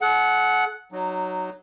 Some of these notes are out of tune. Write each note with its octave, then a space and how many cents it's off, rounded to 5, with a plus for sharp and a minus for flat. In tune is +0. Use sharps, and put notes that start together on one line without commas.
A4 -45 F#5 +0
F#3 +5 D#4 -25